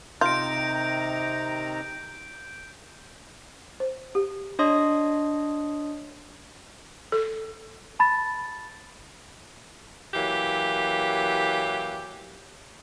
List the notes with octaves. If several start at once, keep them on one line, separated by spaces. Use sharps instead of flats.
C3 D#3 F4 A#5 G6 D7
C5
G4
D4 C#5 D#5 C6 D#6
A4
A5 B5 A6
E3 F#3 A#3 G4